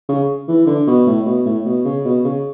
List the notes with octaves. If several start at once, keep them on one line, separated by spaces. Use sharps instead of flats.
C#3
E3
D3
B2
A2
B2
A2
B2
C#3
B2
C#3